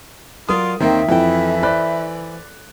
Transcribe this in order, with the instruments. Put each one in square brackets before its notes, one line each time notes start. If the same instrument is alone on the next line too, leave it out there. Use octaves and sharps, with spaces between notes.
[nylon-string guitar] F#3 A#4 D5 [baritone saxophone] F4 [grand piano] D#6
[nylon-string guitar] D#2 C#5 [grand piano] D#3 A#3 [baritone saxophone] C4 [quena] E5
[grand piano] F2 [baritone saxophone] E3 [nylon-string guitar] E4 A4 G5
[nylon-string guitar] C5 [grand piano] D5 B5 F#6